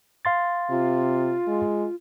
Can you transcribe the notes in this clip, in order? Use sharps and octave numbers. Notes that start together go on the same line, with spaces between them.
F5 C6 A6
C3 F4
G#3